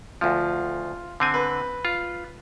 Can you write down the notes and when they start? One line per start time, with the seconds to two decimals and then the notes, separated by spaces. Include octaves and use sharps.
0.21 D2 F3 F4
1.20 D3 C4 G#5
1.34 B4
1.85 F4